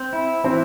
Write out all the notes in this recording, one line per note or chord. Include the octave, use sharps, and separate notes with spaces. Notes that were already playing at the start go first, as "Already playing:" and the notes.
Already playing: C4
E4
E3 C4